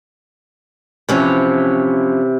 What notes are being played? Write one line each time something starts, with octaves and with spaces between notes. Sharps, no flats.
C3 E3 F3 C#4 C#5